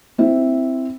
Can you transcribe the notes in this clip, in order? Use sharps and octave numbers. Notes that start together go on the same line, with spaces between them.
C4 E4